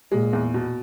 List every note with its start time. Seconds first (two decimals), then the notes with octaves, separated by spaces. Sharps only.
0.12 A#2 G#3
0.33 E2
0.54 B2